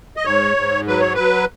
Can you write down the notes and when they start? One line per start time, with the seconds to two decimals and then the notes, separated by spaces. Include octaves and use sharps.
0.17 D#5
0.25 G#2 C#5
0.57 G#2
0.87 F#3 B4
1.00 C#5
1.14 F#3 B4